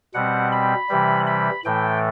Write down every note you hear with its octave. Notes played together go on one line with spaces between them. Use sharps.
B2 G3 C4 F#5
B5
C3 E3 G3
B5
A2 E3 A3 G5